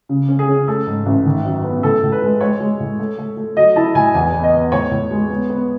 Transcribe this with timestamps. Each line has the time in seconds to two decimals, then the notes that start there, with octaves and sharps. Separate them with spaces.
0.09 C#3
0.29 C#4
0.39 G#4
0.48 C#4
0.68 A3 A4
0.87 G#2
1.06 A1
1.26 D#3
1.45 F#2
1.64 B3
1.83 A2 A4
2.03 A2
2.12 B4
2.22 G#3
2.41 G#3 C#5
2.60 G#3
2.80 A2
2.99 A3
3.18 A3
3.37 A3
3.57 F#3 D#5
3.76 E4 A5
3.95 A2 G#5
4.14 E2 G#5
4.33 B3
4.43 D#5
4.53 B3
4.72 A2 C#5
4.91 A2
5.11 G#3
5.30 B3
5.50 B3